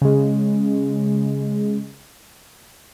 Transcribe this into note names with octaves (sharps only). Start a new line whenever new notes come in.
C#3 G#3